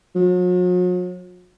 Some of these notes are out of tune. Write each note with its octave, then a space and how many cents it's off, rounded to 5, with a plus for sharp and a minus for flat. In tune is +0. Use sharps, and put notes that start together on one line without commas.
F#3 -45